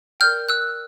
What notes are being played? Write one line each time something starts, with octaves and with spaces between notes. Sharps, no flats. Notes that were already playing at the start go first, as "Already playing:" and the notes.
A#4 D5 G5 F6 G6
E6 F#6